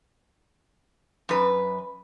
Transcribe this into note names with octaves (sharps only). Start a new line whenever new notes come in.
F#2 B4